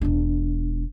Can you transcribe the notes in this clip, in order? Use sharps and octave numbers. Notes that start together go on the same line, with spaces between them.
E1 D4